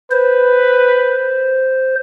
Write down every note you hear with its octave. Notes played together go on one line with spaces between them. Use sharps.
B4 C5